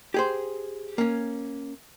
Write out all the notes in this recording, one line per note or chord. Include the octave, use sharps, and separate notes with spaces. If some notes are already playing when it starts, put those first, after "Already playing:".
G4 G#4 C5
A#3 C#4